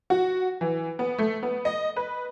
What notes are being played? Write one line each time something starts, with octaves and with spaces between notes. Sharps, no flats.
F#4
E3
B3
A3
B3
D#5
B4